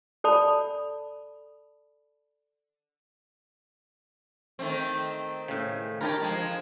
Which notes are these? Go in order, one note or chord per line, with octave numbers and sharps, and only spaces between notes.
A4 D5 A5 B5
D#3 A3 C4
A2 C#3
D3 G4 A#4 A5
F3 G#3